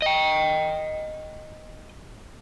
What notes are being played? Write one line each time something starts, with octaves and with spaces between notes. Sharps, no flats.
D#5 G5